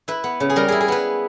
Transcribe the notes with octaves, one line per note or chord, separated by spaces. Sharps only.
E4 B4
B3
C#3
G#4
G3 A#4
E4 G#4
G#4
B3 B4